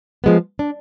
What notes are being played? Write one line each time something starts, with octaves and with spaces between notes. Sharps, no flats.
F3 G#3 B3
D4